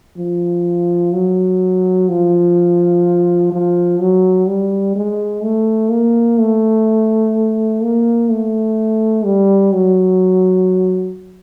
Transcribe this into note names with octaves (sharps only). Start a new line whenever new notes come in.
F3
F#3
F3
F3
F#3
G3
G#3
A3
A#3
A3
A#3
A3
G3
F#3